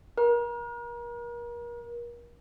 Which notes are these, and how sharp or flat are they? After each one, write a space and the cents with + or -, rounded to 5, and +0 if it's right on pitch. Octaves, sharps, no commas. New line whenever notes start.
A#4 +35